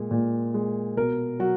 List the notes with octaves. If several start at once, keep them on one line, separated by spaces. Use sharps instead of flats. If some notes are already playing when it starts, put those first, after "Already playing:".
Already playing: A#2 G#3
A#2
G#3
B2 A#4
F#3 F#4